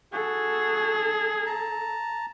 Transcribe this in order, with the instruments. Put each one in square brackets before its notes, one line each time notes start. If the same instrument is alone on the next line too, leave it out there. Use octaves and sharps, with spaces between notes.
[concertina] F#4 F#5 [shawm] G#4 [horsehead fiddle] A4
[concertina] A5 A#5